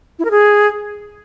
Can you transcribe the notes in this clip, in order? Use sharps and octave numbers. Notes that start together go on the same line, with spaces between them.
E4
A#4
G#4